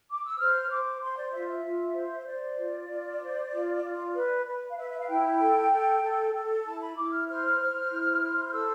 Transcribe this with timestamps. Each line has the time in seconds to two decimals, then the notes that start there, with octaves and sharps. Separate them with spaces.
0.10 D6
0.25 E6
0.39 C5 F6
0.70 C5 D6
1.01 C5 C6
1.17 D5
1.32 F4 E5
1.49 E5
1.64 F4
1.95 C5
2.26 C5 D5
2.57 F4
2.89 F4
3.20 C5
3.52 F4
3.83 F4
4.14 B4
4.46 B4
4.69 F5
4.78 B4 E5
4.90 E5
5.00 F5
5.09 E4 G5
5.40 A4
5.71 A4
6.03 A4
6.34 A4
6.65 E4 A5
6.81 B5
6.96 E4 D6
7.12 F6
7.27 C5 F6
7.60 C5
7.91 E4
8.22 C5
8.47 F6
8.53 A4 E6